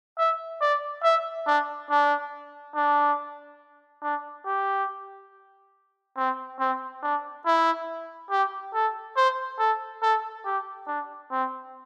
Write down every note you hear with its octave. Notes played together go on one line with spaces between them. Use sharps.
E5
D5
E5
D4
D4
D4
D4
G4
C4
C4
D4
E4
G4
A4
C5
A4
A4
G4
D4
C4